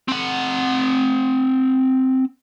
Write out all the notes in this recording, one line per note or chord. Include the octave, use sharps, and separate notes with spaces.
C4 F#5